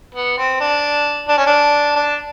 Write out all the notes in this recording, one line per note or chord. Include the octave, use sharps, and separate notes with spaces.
B3
C4
D4
D4
C#4
D4
D4